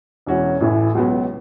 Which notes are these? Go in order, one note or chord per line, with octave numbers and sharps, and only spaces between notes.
E1 E2 E3 C#4 F#4
A1 A2 E3
C#2 B2 F#3 B3